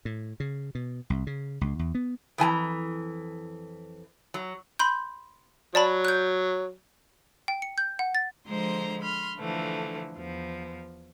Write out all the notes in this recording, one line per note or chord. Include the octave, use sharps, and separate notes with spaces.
A2
C#3
B2
C2
C#3
C#2
E2
B3
F2 E3 G#5 A#5
F#3
B5 C6 G6
F#3 D5 A5 B5
F#6 G6
G5
C#7
G6
F#5
A6
D3 F3 G#3 C5 A#5 C6
B5 C6 F6
D3 E3 F3 A3
E2 F3